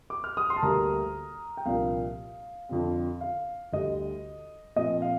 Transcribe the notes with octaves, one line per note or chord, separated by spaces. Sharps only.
D6
F6
D#6
C6
A5
D2 D3 G3 A#3 A#5
G5
C2 A#2 F3 A#3 D4 F5
F2 D3 F3 C4
F5
D2 D3 G3 D#5
A#2 F3 C4 D#5
F5